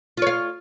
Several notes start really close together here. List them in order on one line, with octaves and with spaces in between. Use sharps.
F4 C#5 F5